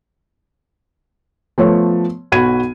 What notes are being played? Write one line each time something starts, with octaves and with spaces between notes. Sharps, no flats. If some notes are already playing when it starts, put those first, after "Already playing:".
F3 A3 B3 C#5
B1 F#4 B5 G#6 D#7